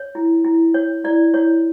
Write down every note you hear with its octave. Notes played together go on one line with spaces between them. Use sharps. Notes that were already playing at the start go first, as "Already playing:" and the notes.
Already playing: C#5
E4
E4
C#5
E4 D5
E4 C#5